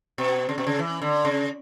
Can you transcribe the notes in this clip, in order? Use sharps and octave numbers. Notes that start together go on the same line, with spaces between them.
B2
C#3
B2
C#3
E3
D3
C#3